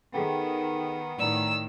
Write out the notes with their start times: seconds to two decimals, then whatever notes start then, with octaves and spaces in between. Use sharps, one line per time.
0.14 D#3 B3 G#4 A4 G5
1.19 A2 D#3 D5 A#5 E6